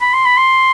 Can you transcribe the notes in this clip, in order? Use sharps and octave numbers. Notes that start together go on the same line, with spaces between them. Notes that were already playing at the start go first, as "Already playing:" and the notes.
B5
C6
B5
C6